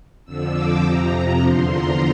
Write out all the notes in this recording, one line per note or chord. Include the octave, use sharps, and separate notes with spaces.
F2 D3 F3 E6
D6
F2 C3 F3 A#5
A#5
E2 D3 F3 C6
A#5